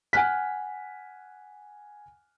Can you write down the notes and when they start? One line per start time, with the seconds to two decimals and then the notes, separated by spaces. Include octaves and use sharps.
0.13 F#5 G#5 F6 F#6 B6